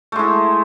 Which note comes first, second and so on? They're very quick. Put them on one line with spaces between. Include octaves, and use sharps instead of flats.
A3 G#3 E4